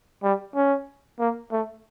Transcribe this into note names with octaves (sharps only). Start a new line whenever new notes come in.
G3
C#4
A#3
A3